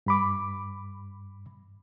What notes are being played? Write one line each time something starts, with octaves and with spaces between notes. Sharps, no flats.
G2 B5 D6